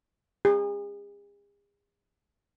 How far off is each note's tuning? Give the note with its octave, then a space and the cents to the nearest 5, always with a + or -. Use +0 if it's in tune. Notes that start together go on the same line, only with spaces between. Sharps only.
G#4 -40